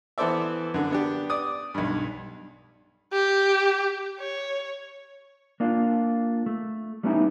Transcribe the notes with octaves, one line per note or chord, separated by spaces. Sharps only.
E3 B3 A4 C5 D5 E5
F#2 D3
B3 D4 G4
D5 D#6
B1 G2
G4
C#5
A#3 D4 F4
A3
G3 A3 B3 C#4 D#4 E4